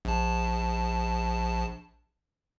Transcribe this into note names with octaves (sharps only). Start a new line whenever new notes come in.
A#1 A5